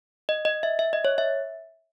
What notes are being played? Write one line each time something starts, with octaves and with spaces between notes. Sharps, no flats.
D#5
D#5
E5
E5
D#5
C#5
E5